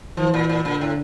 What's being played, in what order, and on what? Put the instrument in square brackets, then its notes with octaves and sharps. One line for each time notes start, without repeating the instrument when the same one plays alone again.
[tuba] E3 [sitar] F3
[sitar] A#2
A#2
[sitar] A#2 [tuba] D3
[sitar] A2